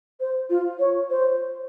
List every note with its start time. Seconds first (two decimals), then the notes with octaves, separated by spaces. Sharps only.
0.20 C5
0.50 F4
0.79 C#5
1.10 C5